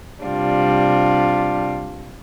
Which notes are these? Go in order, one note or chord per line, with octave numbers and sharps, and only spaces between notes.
C3 G3 D4 F4